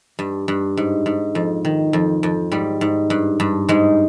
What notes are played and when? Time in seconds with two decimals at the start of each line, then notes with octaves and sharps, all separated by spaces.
0.19 G2
0.48 G2
0.77 G#2
1.06 G#2
1.35 F2
1.65 D#3
1.93 F2
2.23 F2
2.52 G#2 G3
2.81 G#2
3.10 G2
3.40 G2
3.69 G#2 G#3